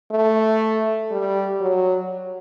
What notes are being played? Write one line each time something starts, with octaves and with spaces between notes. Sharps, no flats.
A3
G3
F#3